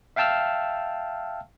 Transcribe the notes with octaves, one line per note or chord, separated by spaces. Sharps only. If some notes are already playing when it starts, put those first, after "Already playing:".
E5 F5 G5 A5 E6 F6